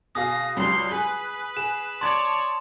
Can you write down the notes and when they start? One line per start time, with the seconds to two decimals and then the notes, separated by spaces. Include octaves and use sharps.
0.15 B2 G#4 F5 D#6 A#6
0.56 C#2 F#3 G3 C6
0.91 G#4 B4
1.57 G#4 E7
2.01 C#5 D5 A5 C6 G#6